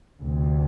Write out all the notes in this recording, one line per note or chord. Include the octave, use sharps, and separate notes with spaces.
D2 C3